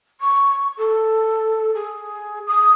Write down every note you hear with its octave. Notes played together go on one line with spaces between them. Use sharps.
C#6
A4
G#4
D#6